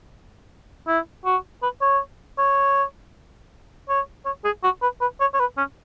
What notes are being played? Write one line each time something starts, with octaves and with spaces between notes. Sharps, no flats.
E4
F#4
B4
C#5
C#5
C#5
C#5
G#4
F#4
B4
B4
C#5
C#5
B4
C#4